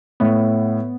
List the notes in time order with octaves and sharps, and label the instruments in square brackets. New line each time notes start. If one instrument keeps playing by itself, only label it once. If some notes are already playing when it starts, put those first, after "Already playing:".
[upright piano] A2 [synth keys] B3